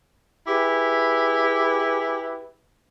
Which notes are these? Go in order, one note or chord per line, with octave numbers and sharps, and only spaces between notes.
E4 G4 G#4 B4